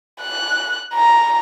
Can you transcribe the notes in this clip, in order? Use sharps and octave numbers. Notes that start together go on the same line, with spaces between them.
F#6
A#5